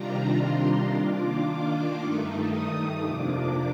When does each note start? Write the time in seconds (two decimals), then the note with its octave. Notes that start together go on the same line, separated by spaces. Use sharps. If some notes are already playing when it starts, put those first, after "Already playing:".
Already playing: C3 D#3 G3 D4 F4 A#5
0.40 C6
0.92 D#3 A#3 D4 F4 D6
1.98 G2 D#3 A3 D#4
2.51 D#6
3.03 F2 C3 F3 A#3 D4 D6